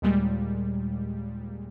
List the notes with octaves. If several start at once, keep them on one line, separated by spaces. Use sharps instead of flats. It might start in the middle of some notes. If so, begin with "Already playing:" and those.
D#2 A#2 G3 G#3